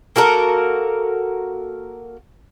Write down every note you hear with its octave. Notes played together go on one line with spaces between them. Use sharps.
A#3 F#4 A4 A#4